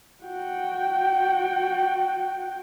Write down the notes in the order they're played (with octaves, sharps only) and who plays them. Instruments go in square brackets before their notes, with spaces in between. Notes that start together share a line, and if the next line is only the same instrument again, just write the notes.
[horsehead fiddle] F#4 G5